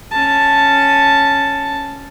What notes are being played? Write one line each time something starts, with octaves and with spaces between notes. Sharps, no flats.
C#4 A5